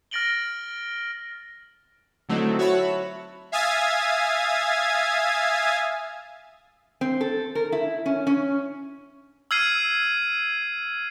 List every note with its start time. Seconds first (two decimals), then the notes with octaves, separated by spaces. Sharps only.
0.11 F6 A6 A#6 D7 F#7 G7
2.29 D3 F#3 A3 C4 D#4 E4
2.59 F#4 C#5 E5 A5 B5
3.52 E5 F5 G#5 D#6 G#6 A6
7.01 C4
7.21 A4
7.55 A#4
7.72 E4
8.06 C#4
8.27 C#4
9.51 E6 F6 G#6 C7 D#7